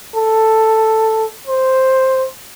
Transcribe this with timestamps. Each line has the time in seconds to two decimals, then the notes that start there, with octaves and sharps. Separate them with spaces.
0.15 A4
1.47 C5